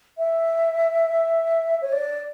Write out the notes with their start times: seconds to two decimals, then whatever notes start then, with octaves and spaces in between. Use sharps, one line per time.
0.17 E5
1.81 C#5
1.92 D5